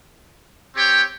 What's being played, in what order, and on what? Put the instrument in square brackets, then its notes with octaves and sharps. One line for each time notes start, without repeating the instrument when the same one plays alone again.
[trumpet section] C4 G4 C#5 G5